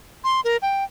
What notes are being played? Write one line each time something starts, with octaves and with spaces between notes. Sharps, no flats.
C6
A#4
G5